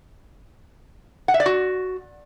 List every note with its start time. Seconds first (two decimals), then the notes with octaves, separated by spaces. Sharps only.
1.28 F#5
1.34 E5
1.40 D5
1.46 F#4